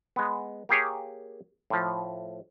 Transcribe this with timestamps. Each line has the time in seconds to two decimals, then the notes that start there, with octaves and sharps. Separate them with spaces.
0.16 G#3 B3
0.69 A#3 G4 G#4 C#5
1.70 A2 F3